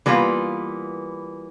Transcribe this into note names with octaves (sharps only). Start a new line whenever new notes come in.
E3 G3 A#3 B3 F4